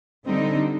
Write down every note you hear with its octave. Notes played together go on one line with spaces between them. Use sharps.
D3 G3 C4 D#4